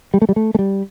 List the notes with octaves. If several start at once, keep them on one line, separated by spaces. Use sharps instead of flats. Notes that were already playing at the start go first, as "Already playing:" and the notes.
G3
A3
G3
A3
A3
G3